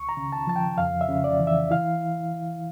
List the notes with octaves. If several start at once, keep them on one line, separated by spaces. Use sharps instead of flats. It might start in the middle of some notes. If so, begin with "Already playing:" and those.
Already playing: C#2 C#6
A#5
C#3
A5
F3 A5
G5
F2 F5
E5
C#3
D5
E3
E5
E4 F5